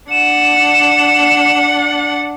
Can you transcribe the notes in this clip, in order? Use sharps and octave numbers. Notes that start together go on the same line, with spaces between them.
D4 F#5 E7